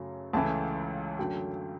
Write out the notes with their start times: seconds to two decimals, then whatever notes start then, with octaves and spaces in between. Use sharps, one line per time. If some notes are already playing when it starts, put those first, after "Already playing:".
Already playing: F#2 C#3 F#3 A3
0.33 C#2 C#3 E3 A3 A5
1.18 F#2 D3 F#3 A3 G5